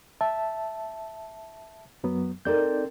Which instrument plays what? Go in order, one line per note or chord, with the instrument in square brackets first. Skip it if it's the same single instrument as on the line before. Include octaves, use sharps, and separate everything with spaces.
[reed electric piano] E5 A5
F#2 F#3 B3
[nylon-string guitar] C4 A4 A#4 [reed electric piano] D#4 D5 G6